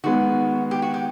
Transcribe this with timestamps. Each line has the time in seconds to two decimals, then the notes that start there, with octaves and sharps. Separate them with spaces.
0.04 D#3 G#3 B3 F#4
0.71 G4
0.82 F#4
0.94 G4